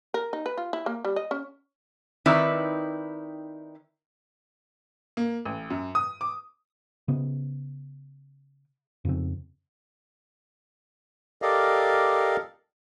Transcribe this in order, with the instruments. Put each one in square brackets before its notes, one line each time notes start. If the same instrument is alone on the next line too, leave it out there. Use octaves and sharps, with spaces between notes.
[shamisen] A#4
D#4
B4
F4
E4
A#3
G3
D#5
C#4
[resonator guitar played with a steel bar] D#3 C4 D#4 E4 B4 D5
[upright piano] A#3
A1
F#2
D#6
D6
[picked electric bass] C#3 B3
F2 C#3 C4
[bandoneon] G4 A4 A#4 D5 D#5 F5